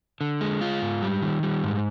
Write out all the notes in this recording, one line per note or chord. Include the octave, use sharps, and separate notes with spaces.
D3
G#3
F4
G#2
G3
D#3
G3
G#2